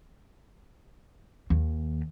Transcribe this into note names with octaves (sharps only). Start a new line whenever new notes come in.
D#2